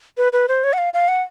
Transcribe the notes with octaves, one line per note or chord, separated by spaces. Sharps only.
B4
B4
C5
C#5
F#5
F5
F5
F#5